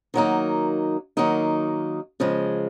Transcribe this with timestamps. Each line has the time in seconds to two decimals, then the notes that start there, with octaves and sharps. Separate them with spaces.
0.14 D#3 F#3 A#3 D#4
1.17 D#3 F#3 A#3 D#4
2.20 C#3 F3 G#3